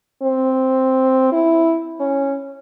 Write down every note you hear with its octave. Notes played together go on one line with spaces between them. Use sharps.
C4
E4
C#4